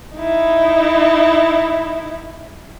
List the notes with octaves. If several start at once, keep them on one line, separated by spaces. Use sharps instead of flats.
D#4 E4